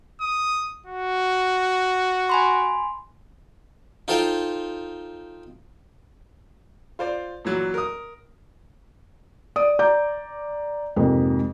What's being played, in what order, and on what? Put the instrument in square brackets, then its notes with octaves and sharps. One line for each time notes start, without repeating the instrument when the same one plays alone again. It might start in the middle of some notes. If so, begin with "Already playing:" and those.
[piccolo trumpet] D#6
F#4
[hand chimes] G#5 B5 C6
[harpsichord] D#4 F4 A4 C5 F5 G5
[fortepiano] F4 C5 D5
A#2 E3 F#3
A#4 D#6
[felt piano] D5 D#6 D7
D5 A#5 D6 G6
F2 G#2 C3 G#3 A#3